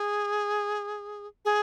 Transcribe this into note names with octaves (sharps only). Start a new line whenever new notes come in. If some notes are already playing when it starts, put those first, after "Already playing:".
Already playing: G#4
G#4